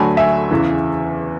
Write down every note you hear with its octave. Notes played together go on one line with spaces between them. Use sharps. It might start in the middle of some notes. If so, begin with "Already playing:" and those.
Already playing: D2 D3 F#3 A3 G#5 B5
E5 G#5
E2 C#3 E3